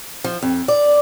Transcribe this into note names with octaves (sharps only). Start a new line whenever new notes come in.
F3
F2
D5